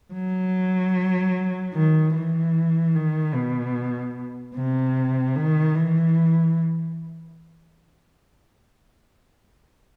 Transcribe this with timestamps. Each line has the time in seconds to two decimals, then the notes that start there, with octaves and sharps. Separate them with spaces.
0.13 F#3
1.74 D#3
2.14 E3
2.95 D#3
3.34 B2
4.55 C3
5.36 D#3
5.75 E3